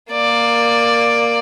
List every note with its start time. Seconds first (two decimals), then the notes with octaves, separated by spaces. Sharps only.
0.12 A#3 D5